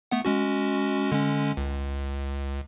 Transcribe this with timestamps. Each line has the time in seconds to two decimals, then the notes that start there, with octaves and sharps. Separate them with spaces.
0.11 A3 B3 F#5
0.25 G#3 C#4 F#4
1.12 D3 G#3 C#4
1.57 C#2